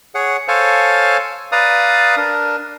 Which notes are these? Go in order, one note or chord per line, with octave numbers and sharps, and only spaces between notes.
G#4 C#5 F#5
A4 C5 C#5 F5 G#5 A5
B4 D5 F5 A#5 D#6
D4 A#4